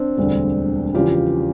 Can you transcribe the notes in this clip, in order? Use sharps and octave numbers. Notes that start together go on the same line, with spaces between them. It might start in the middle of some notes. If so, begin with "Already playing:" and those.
Already playing: C4 D4
E1 D2 D3 G3
E2 C#3 F3 F4 G4